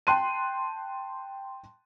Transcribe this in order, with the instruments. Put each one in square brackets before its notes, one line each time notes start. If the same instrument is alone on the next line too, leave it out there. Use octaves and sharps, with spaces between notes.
[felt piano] G5 A5 C6 F#6 D#7